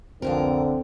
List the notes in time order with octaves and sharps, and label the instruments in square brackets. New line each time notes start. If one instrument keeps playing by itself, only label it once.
[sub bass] C2 [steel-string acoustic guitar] F2 G#2 A#4 [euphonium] D3 [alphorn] C4